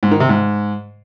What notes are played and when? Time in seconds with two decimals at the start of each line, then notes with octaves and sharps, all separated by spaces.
0.03 G#2
0.11 D#3
0.20 C3
0.29 G#2